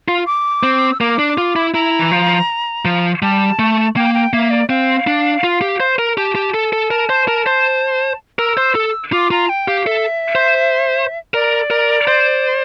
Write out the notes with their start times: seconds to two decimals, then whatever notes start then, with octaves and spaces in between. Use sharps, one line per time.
0.08 F4
0.27 D6
0.63 C4
0.92 E6
1.00 A#3 D6
1.19 D4
1.38 F4
1.56 E4
1.74 E4 A#5
1.99 E3
2.11 F3
2.85 F3
3.22 G3 A5
3.59 A3
3.96 A#3 G5
4.14 G5
4.33 A#3 E5
4.51 D5
4.69 C4 F5
5.07 D4
5.44 F4
5.62 G4
5.80 C5
5.99 A#4
6.17 G4 A5
6.35 G4
6.54 A4
6.73 A4
6.91 A#4
7.09 C5
7.28 A#4
7.47 C5
8.39 A#4 E6
8.57 C5
8.75 A4
9.12 F4 D6
9.31 F4 A#5
9.49 G5
9.68 G4 F5
9.86 A4 E5
10.35 C5
11.34 A#4 D5
11.70 A#4
12.08 C5